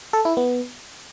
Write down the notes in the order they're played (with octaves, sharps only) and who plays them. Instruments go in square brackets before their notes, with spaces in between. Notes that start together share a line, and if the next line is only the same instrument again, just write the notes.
[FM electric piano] A4
E4
B3